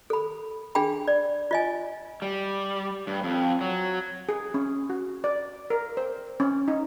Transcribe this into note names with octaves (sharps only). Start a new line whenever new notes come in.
A4 B5
D4 G#4 G5 B5
D5
F4 D#5 G#5
G3
G2
F2
F#3
G#4
C#4
F#4
D5
A#4
C5
C#4
D#4